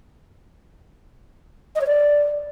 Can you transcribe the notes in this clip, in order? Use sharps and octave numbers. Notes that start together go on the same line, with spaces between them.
D#5
C#5
D5